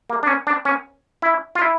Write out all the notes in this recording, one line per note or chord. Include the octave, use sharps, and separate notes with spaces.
A#3
D4
C#4
D4
C#4
E4
F4
E4